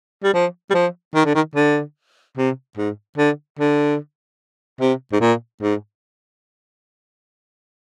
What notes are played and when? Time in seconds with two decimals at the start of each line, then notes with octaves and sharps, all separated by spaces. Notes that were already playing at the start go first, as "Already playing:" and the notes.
0.24 G3
0.34 F3
0.70 G3
0.74 F3
1.15 D#3
1.25 D3
1.35 D#3
1.55 D3
2.37 C3
2.77 G#2
3.18 D3
3.59 D3
4.81 C3
5.12 G#2
5.21 A#2
5.62 G#2